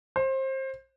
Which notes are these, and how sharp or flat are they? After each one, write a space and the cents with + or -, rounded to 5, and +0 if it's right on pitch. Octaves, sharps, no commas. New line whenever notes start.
C5 +25